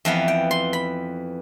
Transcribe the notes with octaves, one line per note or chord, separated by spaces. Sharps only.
F2 E3 B3 F5
G5
C6
B5